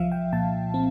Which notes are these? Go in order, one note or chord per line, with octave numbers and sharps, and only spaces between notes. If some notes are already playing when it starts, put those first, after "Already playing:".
Already playing: C2 F3 E5 F5
G5
A#2 A5
C4